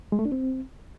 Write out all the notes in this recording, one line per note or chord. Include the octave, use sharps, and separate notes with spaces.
G#3
A3
D4
C4